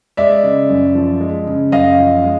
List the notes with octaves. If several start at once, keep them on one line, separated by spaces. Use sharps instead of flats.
G#3 D5 E5
C#3
F#2
F3
G#3
C#3
F#2 D#5 F5
F3
G#3